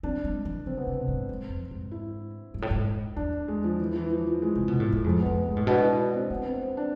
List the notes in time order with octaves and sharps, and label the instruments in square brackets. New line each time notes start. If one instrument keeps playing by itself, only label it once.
[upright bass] C4 [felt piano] D4
[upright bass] G#3
E3
[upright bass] D3 [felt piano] C4
[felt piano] B3
[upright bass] C3 [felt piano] C4
[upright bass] G#2
G#2
F2
G#2
[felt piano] E4
[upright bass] G#2
A2
G#2
[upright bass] E2 [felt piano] D4
[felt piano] G#3
F3
E3
E3
F3
F3
G#3
[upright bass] C3
B2
A2
G#2
[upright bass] F2 [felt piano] G#3
[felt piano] B3
[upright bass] G#2
[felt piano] G#3
[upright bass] B2
[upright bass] A2 [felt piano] G#3
[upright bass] B2 [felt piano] D4
[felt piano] E4
D4
C4
[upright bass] D3 [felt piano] B3
[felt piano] C4
C4
D4